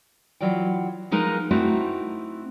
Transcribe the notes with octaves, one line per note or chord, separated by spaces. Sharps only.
E3 F#3 F4 D5 G5
F3 G#3 D#4 A#4 B4
A3 C4 D#4 E4 F#4